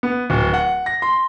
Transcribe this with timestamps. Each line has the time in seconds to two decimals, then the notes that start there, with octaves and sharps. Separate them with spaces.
0.03 B3
0.30 D1
0.54 F#5
0.86 A#6
1.02 C6